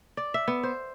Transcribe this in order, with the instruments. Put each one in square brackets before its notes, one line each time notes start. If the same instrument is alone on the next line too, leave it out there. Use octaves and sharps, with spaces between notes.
[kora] D5
E5
B3
C5